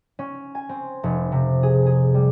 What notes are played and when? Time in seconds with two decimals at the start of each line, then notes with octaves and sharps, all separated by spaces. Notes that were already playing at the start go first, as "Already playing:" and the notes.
0.19 C#4
0.55 G#5
0.69 C4
1.03 F1
1.32 C3
1.63 G#4
1.86 G#4
2.14 G3